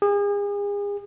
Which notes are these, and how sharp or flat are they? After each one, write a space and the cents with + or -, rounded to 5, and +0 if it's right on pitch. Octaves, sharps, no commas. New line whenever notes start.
G#4 -40